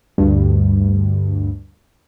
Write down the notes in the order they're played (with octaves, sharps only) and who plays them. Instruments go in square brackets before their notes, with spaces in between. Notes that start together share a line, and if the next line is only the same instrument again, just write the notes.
[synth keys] D2 G2